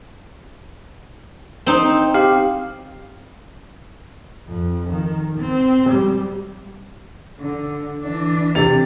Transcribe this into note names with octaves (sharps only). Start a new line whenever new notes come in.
C4 D#4
G4 F5
F2
D#3
C4
G3
D3
E3 D4
C3 A6 F7